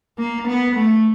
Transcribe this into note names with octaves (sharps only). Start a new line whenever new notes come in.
A#3
B3
A3